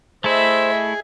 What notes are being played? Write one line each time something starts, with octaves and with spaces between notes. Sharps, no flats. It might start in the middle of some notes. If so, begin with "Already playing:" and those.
A3 E4 G#4 C5 D#5 E5